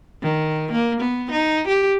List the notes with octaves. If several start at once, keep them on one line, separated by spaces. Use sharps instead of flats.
D#3
A#3
B3
D#4
G4